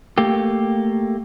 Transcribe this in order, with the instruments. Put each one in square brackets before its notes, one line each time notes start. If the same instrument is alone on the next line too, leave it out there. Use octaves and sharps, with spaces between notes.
[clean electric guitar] A3 A#3 G4